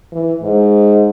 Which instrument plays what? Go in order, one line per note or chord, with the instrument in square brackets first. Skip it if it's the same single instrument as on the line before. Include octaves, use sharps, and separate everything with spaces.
[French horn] E3
G#2